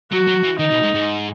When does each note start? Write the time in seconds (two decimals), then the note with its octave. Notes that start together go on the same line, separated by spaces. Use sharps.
0.12 F#3 F#4
0.27 F#3
0.43 E3
0.59 D#3 D#4
0.71 B2
0.83 G#2
0.94 G#2